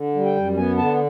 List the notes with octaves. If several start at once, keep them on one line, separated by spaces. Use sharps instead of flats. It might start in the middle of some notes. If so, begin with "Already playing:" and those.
Already playing: D3
G3
G5
F#2
B3 G#5
D3 A5